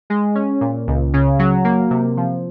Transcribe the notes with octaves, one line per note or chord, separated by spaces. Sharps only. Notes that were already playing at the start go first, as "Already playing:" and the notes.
G#3
C#4
A#2
C#2
C#3
F#3
A#3
C3
F3